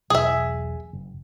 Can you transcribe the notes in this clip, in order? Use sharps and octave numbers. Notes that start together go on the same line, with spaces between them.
E1 B1 G#4 E5
F#1